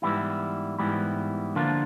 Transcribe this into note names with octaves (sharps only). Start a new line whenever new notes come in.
G#2 E3 G3 B3 E4
G#2 E3 G3 B3 E4
D3 F3 A#3 D4 F4